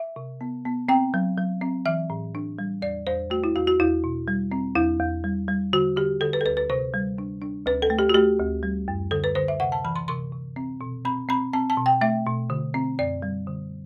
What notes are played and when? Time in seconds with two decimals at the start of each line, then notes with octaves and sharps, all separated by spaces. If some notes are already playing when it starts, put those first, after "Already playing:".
Already playing: E5
0.16 C3
0.41 B3
0.65 B3
0.89 C4 G5
1.14 F#3
1.37 F#3
1.61 C4
1.86 E3 E5
2.10 A2
2.35 D4
2.59 G3
2.82 E2 D5
3.07 E2 C5
3.30 A3 F#4
3.44 E4
3.56 E2 F#4
3.67 F#4
3.80 E2 E4
4.04 B2
4.28 G3
4.52 C4
4.75 E2 E4
5.00 E2
5.24 G3
5.48 G3
5.73 D3 F#4
5.96 D3 G4
6.21 D3 A4
6.33 B4
6.41 A4
6.46 D2 B4
6.57 B4
6.70 C3 C5
6.94 G3
7.18 D4
7.42 D4
7.66 D2 B4
7.82 A4
7.90 A3
7.99 G4
8.09 F#4
8.14 A3 G4
8.39 D2
8.63 G3
8.88 F#2
9.11 D3 A4
9.24 B4
9.35 D3 C5
9.48 E5
9.60 C3 F#5
9.72 A5
9.85 E3 B5
9.96 C6
10.08 C3 C6
10.32 C3
10.56 C4
10.81 B2
11.05 C4 B5
11.29 C4 B5
11.53 C4 A5
11.70 A5
11.77 B2
11.86 G5
12.01 A3 E5
12.26 B2
12.50 D3
12.74 C4
12.99 F#2 D5
13.22 G3
13.47 D3